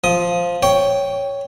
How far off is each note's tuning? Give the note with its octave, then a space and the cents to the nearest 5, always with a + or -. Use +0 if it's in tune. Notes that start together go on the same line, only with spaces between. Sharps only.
F3 +0 D#6 +10
C#5 +5 G5 +0 C#6 +0